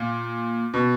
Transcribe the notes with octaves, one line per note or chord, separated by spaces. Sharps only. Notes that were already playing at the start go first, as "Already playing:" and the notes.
Already playing: A#2
B2